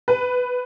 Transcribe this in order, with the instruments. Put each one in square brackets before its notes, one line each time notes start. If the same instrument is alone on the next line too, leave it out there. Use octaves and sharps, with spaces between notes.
[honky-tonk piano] B4